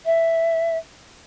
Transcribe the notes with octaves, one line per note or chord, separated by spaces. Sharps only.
E5